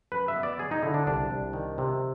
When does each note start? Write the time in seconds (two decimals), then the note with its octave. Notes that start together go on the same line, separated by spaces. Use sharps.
0.12 F#2 B4
0.28 E5
0.36 B3
0.43 D5
0.59 F#3 G#4
0.71 D#4
0.83 D3 E4
0.94 D4
1.07 C2 D4
1.31 C2
1.53 D#3
1.78 C3